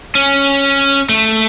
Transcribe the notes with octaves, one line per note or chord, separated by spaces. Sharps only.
C#4
A3